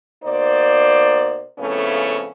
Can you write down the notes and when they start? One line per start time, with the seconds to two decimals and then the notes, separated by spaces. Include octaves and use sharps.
0.24 B2 A#3 D#4 C5 D5
1.59 F2 A2 C#3 A3 B3 C#4